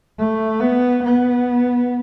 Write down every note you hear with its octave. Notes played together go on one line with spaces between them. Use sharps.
A3
B3
B3